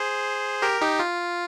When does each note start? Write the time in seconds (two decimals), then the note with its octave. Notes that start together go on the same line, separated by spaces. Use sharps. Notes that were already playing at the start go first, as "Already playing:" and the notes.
Already playing: G#4 C5
0.62 G4 A#4
0.81 D#4 G4
0.99 F4